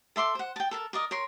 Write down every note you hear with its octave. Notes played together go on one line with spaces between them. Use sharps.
A4 E5 C6 D6
C5 F#5
G5 A5
A4 A#4 A5
A#4 D5 D#5
A#4 C#5 C6